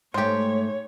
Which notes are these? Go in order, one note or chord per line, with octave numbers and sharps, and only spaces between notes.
G#2 A3 G4 C5 C#5